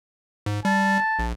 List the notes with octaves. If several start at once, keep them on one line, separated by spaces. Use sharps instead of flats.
G#2
G3 A5
A#1